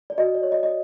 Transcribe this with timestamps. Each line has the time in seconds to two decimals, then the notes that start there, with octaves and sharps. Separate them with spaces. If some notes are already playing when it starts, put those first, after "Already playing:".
0.10 D5
0.18 F#4 D#5
0.35 D5
0.43 C#5
0.52 D#5
0.63 D#5